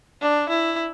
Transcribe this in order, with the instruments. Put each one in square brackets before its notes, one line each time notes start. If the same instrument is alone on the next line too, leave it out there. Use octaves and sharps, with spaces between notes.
[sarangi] D4
E4